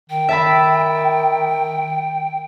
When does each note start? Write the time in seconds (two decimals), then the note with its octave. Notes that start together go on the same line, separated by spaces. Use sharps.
0.10 D#3 G5
0.29 E5 A5 B5